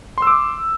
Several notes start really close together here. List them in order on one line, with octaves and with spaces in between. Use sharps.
C6 E6 D6